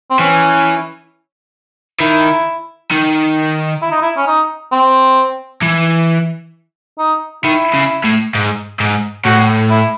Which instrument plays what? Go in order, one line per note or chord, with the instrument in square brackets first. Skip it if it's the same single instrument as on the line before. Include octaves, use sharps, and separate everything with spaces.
[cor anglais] C4
[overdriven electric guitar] E3 [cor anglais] C#4
[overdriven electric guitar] D#3 [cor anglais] E4
[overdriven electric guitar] D#3
[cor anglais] E4
D#4
E4
C#4
D#4
C4
[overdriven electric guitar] E3
[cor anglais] D#4
[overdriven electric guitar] D#3 [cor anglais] E4
[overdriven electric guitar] C#3
A2
G#2
G#2
[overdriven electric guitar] A2 [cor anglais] F#4
[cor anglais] E4